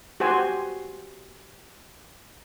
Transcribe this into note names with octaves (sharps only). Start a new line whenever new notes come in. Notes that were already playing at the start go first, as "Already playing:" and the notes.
F#4 G4 C5 G#5